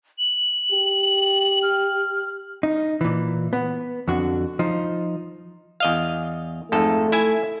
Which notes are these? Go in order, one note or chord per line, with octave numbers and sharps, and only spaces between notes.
F#7
G4
F6
D#4
A#2 E3
B3
F2 D3 F#4
F3 D#4
E2 D#5 F5
F2 G#2 A3 A4
E4 E5 G#5